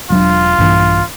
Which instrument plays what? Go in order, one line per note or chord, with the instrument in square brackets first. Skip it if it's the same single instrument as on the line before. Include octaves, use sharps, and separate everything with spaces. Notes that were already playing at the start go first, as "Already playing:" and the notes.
[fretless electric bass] E1 F#3 D4 [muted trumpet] F4
[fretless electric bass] A#1 G2 E3